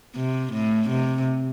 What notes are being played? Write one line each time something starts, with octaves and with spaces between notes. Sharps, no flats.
C3
A2
C3